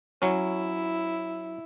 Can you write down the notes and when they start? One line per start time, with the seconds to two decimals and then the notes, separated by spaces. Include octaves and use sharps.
0.22 F#3 C#4 E4